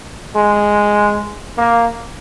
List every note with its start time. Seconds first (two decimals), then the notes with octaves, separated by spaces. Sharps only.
0.36 G#3
1.58 A#3